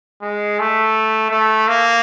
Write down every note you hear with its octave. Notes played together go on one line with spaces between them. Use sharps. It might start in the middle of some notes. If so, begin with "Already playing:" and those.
G#3
A3
A3
A#3